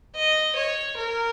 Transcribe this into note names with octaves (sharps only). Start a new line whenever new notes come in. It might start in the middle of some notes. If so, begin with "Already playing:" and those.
D#5
C#5
A#4